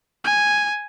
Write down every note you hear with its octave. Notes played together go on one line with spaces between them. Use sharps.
G#5